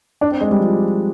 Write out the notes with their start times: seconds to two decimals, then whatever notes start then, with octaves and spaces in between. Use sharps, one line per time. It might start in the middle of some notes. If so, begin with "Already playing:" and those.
0.21 D4
0.31 C4
0.41 G#3
0.51 G3
0.60 F3